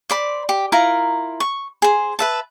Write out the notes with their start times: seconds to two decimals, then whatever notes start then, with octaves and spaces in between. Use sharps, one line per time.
0.10 C5 D5 B5
0.49 G4
0.72 E4 F4 A#4 A#5
1.40 C#6
1.82 G#4 C5
2.19 B4 E5 A5